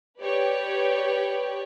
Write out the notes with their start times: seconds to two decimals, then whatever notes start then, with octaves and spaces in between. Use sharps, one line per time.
0.21 G4 B4 C#5 D5 G5